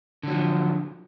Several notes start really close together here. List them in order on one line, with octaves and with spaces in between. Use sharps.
D3 F#3 F3